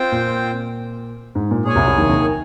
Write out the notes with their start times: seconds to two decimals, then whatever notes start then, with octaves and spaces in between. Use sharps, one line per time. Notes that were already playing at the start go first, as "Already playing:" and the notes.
Already playing: C4 F4 C5 G5
0.12 A#2
1.35 G#2
1.51 A#2
1.64 A#2 G#4 C#5 G#5
1.75 C2 C3
1.87 C2 C3
1.97 D#2 D#3
2.08 D#2 D#3